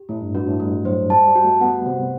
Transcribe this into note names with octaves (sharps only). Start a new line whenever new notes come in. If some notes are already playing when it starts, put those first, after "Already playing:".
Already playing: G4
A2 A3
G2
G2 F#4
A2
G3 A3
F#3 C5
G3 A5
G3
F#4
A3
B3 F#5
C3 C5